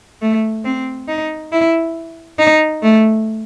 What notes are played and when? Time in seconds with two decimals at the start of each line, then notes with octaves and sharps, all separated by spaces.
0.22 A3
0.65 C4
1.09 D#4
1.52 E4
2.39 D#4
2.83 A3